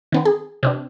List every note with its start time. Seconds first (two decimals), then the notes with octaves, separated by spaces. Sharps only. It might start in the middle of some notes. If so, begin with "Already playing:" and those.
0.12 D#3 B3 C4
0.25 G#4
0.63 C3 C4 D4